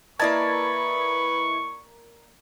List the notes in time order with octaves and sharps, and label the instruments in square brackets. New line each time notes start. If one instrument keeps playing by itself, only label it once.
[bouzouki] A#3 D5 A5 [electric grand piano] E4 D#5 G#6 [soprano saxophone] B4 [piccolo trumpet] C#6